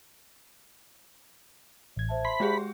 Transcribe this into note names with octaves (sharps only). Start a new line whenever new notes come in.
A1 G#6
C5 E5 A5
B5 C6
G#3 G4 G#4